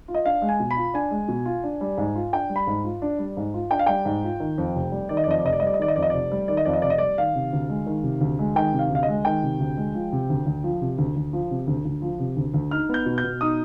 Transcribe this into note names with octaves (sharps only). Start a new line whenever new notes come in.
F4
D#5
D4 F5
G#3
G#5
B2
B5
F4
D4 G#5
G#3
B2
F4
D4
G3
G#2
F4
D4 G5
G3
B5
G#2
F4
D4
G3
G#2
F4
D4 G5
F5
G3 G5
G#2
F4
D#3
F2
F1
G3
D#3 D5
D#5
D5
F2 D#5
D5
F1 D#5
D5
G3 D#5
D5
D#5
D#3 D5
D#5
F2 D5
D#5
F1 D5
G3
D#3 D5
D#5
F2 D5
D#5
F1 D5
D#5
G3 D5
D#3 F5
C3
D2
G#3
D#3
C3
D2
G#3
D#3 G5
C3
F5
D2
F5
D#5
G#3
D#3 G5
C3
D2
G#3
F3
C3
D2
D2
F3
C3
D2
D2
F3
C3
D2
D2
F3
C3
D2
D2
D#4 F6
B3 G6
B2
G6
B2
D#4 D#6